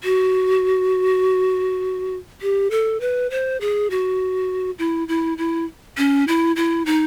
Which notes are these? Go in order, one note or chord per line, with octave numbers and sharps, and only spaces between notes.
F#4
G4
A4
B4
C5
G#4
F#4
E4
E4
E4
C#4
E4
E4
D#4